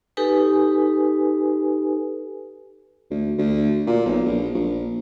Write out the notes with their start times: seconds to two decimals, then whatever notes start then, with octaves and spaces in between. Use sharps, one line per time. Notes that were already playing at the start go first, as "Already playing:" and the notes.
0.17 D#4 G4 A4 B4 G#5
3.11 D2
3.38 D2
3.87 A#2
4.06 B1
4.26 A#1
4.55 A#1